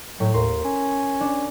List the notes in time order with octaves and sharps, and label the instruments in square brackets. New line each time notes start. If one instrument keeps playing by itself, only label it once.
[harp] A2 [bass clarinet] F#3
[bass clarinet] D#2 [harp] A#4 C6
[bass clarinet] C#4
[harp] D4